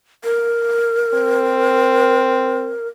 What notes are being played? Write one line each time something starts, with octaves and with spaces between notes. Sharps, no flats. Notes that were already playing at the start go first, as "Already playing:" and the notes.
A#4
C4